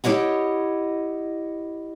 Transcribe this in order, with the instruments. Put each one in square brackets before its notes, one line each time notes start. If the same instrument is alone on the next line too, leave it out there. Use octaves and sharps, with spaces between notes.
[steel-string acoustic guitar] E4 G4 C#5 D#5 F#5